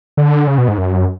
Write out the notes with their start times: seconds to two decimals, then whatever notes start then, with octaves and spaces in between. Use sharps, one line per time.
0.17 D3
0.47 C#3
0.58 B2
0.68 G#2
0.78 F#2